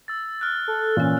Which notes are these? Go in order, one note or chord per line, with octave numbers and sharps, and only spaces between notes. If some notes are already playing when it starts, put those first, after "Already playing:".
E6 A6
F6 F#6
A4
A#2 E3 C#4